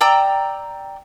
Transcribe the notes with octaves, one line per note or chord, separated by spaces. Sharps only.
D5 G5 A#5 E6